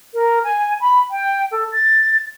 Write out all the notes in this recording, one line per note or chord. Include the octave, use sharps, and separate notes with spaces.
A#4
G#5
B5
G5
A4
A6